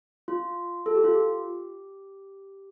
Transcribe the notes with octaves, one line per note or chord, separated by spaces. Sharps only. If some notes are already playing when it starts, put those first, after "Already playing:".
F4
A4
G4
F4
G4